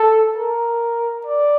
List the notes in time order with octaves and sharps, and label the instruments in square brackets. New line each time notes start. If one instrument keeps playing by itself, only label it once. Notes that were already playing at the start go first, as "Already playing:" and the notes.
Already playing: [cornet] A4
A#4
D5